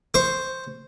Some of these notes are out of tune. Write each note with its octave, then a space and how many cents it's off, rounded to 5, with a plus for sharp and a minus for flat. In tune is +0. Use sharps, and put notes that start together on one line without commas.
C5 +0 C#6 +0